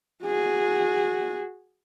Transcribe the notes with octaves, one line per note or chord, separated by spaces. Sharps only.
F#4 G#4